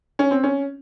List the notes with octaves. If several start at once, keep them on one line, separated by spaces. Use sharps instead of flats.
C#4
C4
C#4